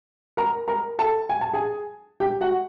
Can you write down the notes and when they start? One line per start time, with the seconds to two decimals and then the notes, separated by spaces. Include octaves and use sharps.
0.37 A#4 A#5
0.68 A#4 A#5
0.99 A4 A5
1.29 G#5
1.41 A5
1.53 G#4 G#5
2.20 G4 G5
2.41 F#4 F#5